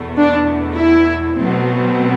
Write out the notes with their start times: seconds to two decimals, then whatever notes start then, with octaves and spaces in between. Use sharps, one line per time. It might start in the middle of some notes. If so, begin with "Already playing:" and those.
Already playing: E2 B2 A3
0.18 D4
0.77 E4
1.35 B2 F#3 A3 C4